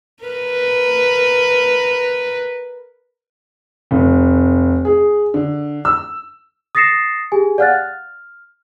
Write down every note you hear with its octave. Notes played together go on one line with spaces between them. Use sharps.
A#4 B4
F1
G#4
D3
E6
D#6 A6 A#6 C7 C#7 E7
G4 G#4 G#5
D5 F5 F#5 F6 F#6 A6
F6